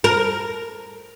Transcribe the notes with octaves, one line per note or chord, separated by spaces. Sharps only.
A#4